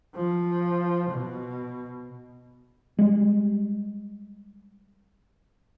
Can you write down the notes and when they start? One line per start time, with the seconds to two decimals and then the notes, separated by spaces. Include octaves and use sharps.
0.16 F3
1.10 B2
2.99 G3 G#3